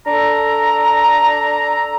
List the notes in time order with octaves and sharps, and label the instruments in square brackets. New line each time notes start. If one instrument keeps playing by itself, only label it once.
[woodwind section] D4 A4 A#5